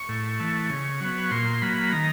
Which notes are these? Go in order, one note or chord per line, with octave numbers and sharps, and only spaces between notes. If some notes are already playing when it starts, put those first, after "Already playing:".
Already playing: C#6
A2
E3 A3
C#3
F#3 B3
A#2 C6
F#3 A#3 B5
D#3 A#5